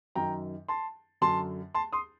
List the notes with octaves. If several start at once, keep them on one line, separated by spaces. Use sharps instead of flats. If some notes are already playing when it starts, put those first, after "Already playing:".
F#2 D#3 G5 A#5
A5 C6
F#2 D3 A5 C6
A5 C6
C6 D#6